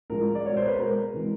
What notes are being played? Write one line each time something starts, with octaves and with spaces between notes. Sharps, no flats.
A2 F3 G#3 A#4
D5
B2 G#3 C#5
C5
B4
B2 G#3 A#4
C3 E3 G#3